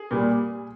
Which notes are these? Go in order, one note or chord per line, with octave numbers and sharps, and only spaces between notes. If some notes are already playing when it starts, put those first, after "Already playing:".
Already playing: G#4
A#2 G3